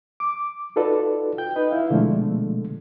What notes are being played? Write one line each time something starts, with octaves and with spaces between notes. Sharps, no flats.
D6
D#4 F4 F#4 A4 B4 D5
G5 G6
D#4 B4 D#5
E4 F5
B2 D3 F3 G#3 A3